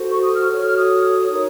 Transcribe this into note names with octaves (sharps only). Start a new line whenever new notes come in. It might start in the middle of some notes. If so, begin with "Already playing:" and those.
Already playing: F#4 A4 C5
C#6
D#6
F6
F#4 A4 C#5
F6
D#6
D#4 A#4 C#5